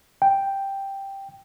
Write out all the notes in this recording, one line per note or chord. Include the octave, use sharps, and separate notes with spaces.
G5